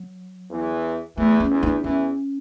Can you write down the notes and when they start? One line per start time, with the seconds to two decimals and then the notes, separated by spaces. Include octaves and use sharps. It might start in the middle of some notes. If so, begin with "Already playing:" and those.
Already playing: F#3
0.50 E2 E3
1.17 E2 E3 A3
1.40 C#4
1.51 E2 E3
1.63 D4
1.84 E2 E3 C#4